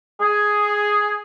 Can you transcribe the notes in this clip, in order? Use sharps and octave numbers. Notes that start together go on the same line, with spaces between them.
G#4